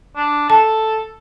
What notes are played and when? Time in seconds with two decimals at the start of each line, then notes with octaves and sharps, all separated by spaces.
0.16 D4
0.50 A4 A5